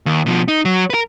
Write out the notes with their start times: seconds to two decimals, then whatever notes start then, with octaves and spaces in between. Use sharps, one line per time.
0.06 D#2
0.26 B2 F3
0.48 D#4
0.65 F#3
0.90 A#4 B4